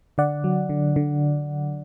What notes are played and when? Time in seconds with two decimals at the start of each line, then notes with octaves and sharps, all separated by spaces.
0.18 D3 D5 F#5
0.44 F#3
0.69 D3
0.96 D3